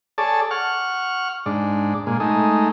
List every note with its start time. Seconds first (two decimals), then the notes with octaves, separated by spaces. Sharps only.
0.18 G#4 A4 C#5 D5 A5
0.51 F#5 C#6 F6
1.46 G#2 D4
2.07 A#2 G#3
2.20 G#3 A3 D#4